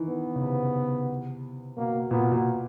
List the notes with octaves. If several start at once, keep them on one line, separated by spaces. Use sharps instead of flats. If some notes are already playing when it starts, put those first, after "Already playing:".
Already playing: D#3 E3
B3
C#3
C3
B2 A#3
A#2 B3
B2
A#2